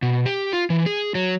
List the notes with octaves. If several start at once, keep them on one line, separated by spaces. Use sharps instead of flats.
B2
G4
F4
E3
G#4
F#3